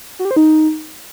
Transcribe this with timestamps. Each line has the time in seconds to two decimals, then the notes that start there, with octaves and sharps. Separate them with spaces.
0.19 F#4
0.25 G4
0.31 C5
0.36 D#4